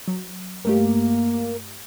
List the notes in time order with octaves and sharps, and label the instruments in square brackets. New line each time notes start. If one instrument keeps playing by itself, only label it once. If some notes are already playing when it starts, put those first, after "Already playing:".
[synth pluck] F#3
[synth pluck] G2 A3 G4 [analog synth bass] A#3